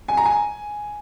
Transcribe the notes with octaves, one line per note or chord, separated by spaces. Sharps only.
G#5
A#5
G#5